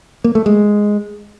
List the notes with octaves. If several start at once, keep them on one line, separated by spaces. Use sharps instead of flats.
A#3
A3
G#3